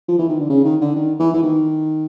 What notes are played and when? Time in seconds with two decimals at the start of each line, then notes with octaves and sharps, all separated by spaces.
0.08 F3
0.19 E3
0.29 D#3
0.40 D3
0.50 C#3
0.65 D#3
0.81 D3
0.96 D#3
1.20 E3
1.34 E3
1.43 D#3